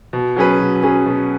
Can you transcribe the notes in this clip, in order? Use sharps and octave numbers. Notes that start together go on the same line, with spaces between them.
B2
F#3 C#4 G#4 B4
B2
F#3 C#4 G#4 B4
B2